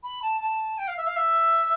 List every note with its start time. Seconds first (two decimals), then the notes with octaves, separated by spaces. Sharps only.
0.03 B5
0.22 A5
0.41 A5
0.78 G5
0.88 F5
0.97 E5
1.07 F5
1.16 E5